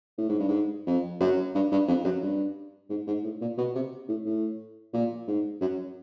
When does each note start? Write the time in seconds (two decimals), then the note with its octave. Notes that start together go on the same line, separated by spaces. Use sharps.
0.18 A2
0.28 G#2
0.39 G2
0.49 G#2
0.87 F2
1.20 F#2
1.55 G2
1.72 G2
1.88 F2
2.05 F#2
2.22 G2
2.90 G#2
3.07 G#2
3.24 A2
3.41 A#2
3.58 B2
3.75 C3
4.08 A2
4.25 A2
4.93 A#2
5.28 G#2
5.61 F#2